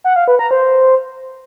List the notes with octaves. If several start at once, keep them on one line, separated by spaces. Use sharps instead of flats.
F#5
F5
B4
A#5
C5